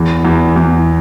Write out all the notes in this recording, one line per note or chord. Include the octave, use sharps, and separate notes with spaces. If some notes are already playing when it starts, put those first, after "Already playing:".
Already playing: E2
E2
E2